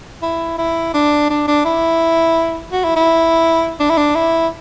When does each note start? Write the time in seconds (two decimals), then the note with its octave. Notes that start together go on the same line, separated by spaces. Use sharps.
0.23 E4
0.58 E4
0.94 D4
1.30 D4
1.48 D4
1.65 E4
2.72 F#4
2.84 E4
2.96 E4
3.80 D4
3.90 E4
3.98 D4
4.15 E4